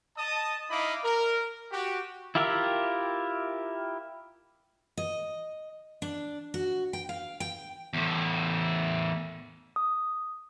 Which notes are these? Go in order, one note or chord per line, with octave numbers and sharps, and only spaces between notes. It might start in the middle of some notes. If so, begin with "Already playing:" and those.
D#5 A5 D#6
D#4 E4 D#5 F5 B5 D6
A#4
F#4 G4
E4 F4 G4 A#4 E5
D#5
D4
F#4
G5
F5
G5
E2 A2
D#6